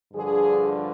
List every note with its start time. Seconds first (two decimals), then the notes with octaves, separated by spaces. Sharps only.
0.13 G2 D3 F3 G#4